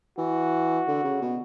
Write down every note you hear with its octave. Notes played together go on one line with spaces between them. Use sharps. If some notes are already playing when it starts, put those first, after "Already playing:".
E3 F#4
D3
C#3
B2